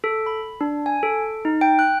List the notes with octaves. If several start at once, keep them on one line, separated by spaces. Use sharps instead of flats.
A4
B5
D4
G#5
A4
D#4
G5
F#6